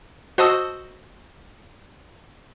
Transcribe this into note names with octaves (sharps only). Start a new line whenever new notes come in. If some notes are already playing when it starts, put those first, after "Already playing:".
F#4 C5 D#5 A5 D#6 E6